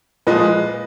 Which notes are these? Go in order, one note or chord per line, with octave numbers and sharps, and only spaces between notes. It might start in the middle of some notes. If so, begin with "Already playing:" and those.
A#2 F3 G#3 B4 D#5